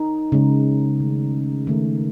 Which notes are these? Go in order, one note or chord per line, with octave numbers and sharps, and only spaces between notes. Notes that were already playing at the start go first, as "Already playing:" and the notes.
Already playing: D#4
C#3 G#3
D#3 A3
D#3 A3